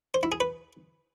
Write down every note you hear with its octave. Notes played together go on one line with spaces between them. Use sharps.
C5
E4
G#4
B4